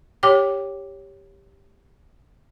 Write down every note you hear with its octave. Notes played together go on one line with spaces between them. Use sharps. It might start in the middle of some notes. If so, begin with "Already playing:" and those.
G4 C#5 G5 D6